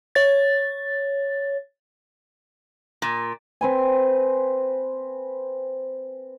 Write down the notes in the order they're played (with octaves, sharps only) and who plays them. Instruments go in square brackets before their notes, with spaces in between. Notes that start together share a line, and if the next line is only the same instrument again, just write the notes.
[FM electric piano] C#5 A6
[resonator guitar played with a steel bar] A#2
[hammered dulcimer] C4 B4 G#5